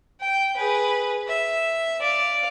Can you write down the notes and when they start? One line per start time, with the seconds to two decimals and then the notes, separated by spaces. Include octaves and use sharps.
0.20 G5
0.57 G#4 B4
1.28 E5
2.00 D5 F5